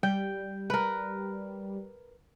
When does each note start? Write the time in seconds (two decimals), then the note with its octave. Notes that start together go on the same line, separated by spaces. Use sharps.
0.03 G3 G5
0.70 A#4 B4